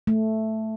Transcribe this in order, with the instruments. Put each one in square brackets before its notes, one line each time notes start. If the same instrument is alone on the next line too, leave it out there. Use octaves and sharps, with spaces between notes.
[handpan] A3